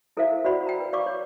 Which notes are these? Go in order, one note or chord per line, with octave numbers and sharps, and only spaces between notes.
E4 A4 A#4 C5 E5 F5
F#4 C5 D5 F#5 B5 C6
G5 A#5
B4
D5 F5 C#6 D6
C#5